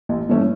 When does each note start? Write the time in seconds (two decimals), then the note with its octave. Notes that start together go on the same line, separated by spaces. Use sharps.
0.09 A1
0.29 G2 E3 A3 C#4